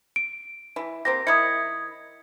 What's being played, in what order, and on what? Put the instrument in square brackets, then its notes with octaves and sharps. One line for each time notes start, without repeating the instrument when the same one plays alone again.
[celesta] D7
[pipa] E3
[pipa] A#3 C4 G4 [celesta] A#6
[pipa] D#3 E4 [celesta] D#6 G#6 C#7